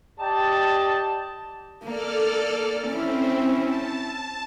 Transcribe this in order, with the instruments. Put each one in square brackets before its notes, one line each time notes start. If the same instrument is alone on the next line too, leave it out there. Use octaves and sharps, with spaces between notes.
[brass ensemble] G4 D5 D#5 G5 A5
[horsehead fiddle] A#3 [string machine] A4 D5 F6
[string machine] C4 [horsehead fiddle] C#4 E4
[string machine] A5